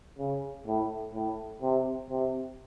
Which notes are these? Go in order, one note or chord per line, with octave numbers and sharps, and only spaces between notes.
C#3
A2
A2
C3
C3